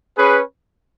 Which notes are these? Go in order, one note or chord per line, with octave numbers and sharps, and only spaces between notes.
C#4 G#4 B4